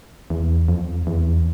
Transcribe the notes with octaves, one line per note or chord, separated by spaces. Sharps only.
E2
F2
E2